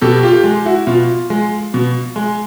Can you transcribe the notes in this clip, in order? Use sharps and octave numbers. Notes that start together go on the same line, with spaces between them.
B2 G4 A4
F4 G4
G#3
E4 F#4
B2 F4
G#3
B2
G#3